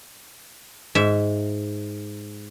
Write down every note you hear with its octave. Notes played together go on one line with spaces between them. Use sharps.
G#2 E5